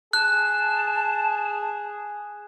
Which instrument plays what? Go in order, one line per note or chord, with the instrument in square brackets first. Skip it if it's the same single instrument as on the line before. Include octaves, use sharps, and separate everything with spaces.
[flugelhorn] G#4 [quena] A5 [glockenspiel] F#6